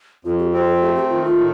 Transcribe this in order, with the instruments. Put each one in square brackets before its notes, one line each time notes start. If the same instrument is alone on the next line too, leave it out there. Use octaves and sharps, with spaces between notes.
[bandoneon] F2 [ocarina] F4
[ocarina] G4
[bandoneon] C4 [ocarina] G4
[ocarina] A4
[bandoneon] A3 [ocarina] G4
[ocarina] G4
[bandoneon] D#3 [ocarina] F4
[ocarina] F4
[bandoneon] A2